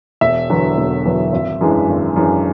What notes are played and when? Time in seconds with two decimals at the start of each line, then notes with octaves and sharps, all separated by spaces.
0.21 E1 E5
0.49 E2 D3 F#3 B3
0.78 E1
1.05 E2 D3 F#3 B3
1.32 G#1
1.61 F#2 E3 G#3 D4
1.88 G#1
2.16 F#2 E3 G#3 D4